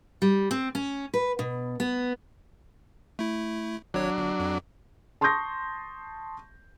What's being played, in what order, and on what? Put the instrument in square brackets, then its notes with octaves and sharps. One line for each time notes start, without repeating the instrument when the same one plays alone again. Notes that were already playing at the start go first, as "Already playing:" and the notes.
[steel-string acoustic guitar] G3
C4
C#4
B4
B2
B3
[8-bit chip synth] A3 E4
[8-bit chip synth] G#1 C#5 [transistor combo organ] F#3 D4
[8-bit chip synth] G1
F2
[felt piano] A5 C6 C#6 D#6 G6 A#6